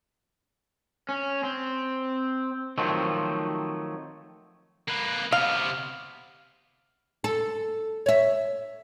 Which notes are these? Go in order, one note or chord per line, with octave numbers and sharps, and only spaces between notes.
C#4
C4
D#3 F3 F#3 A3 C4
A#3 B4
C3 B3 F5
A4
C#5 E5